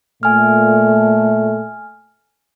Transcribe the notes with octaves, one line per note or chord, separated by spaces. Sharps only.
A#2 A3 G#5 F6